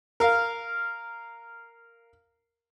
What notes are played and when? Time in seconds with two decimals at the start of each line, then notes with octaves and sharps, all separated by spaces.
0.20 A#4 F5